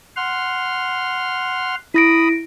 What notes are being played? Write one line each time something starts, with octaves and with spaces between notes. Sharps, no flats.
F#5 C6 F6
E4 B5 D#6 A#6 D7